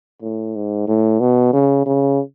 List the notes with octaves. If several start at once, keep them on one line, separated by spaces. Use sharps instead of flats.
A2
G#2
A2
B2
C#3
C#3